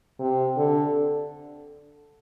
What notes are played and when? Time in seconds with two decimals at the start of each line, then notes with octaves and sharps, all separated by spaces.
0.20 C3
0.57 D3